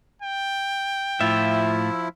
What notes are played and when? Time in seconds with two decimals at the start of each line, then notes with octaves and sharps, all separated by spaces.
0.22 G5
1.21 A2 F3 E4 F4 E5